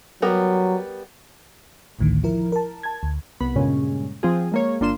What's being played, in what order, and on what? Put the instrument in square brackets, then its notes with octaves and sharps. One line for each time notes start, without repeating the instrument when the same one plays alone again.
[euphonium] F#3 [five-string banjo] G3 B3 A#4
[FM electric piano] A1 D2 A2 D3 D#3
F3 E4 A#4
A#4 A5
A5 G#6
D2
[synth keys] C2 B3 B5
G2 A#2 C#3 G#3 C#4
F3 C4 F4 G#4
G#3 A#3 C#5
G1 A#3 D4 F4 C6 E7